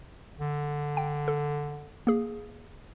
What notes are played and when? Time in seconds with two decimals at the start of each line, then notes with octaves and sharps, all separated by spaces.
0.39 D3
0.97 G5
1.28 A4
2.07 A#3 G#4